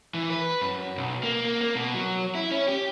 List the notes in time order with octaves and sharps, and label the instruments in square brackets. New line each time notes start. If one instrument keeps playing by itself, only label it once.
[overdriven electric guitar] E3
B4
F#2
B1
A#3
A#3
A#3
B2
F#3
E4
C#4
G4